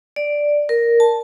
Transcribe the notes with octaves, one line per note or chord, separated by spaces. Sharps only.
D5
A#4
A5